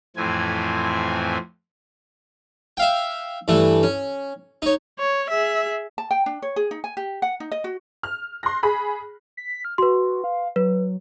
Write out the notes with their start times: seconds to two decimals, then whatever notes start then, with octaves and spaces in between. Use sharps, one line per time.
0.16 F2 A2 E3 C4 G#5
2.77 E5 F5 G5
3.48 G2 E3 A3
3.83 C#4
4.62 D#4 C#5
4.99 C#5
5.30 G#4 E5
5.98 A5
6.11 G5
6.26 D4
6.42 C#5
6.56 G#4
6.71 D#4
6.84 G#5
6.97 G4
7.22 F#5
7.40 D#4
7.52 D#5
7.64 F#4
8.03 F6
8.43 C6 F#6 A#6
8.63 G#4 B5
9.37 B6
9.65 F6
9.78 F#4 B4 C6
10.24 F5
10.56 F#3 B4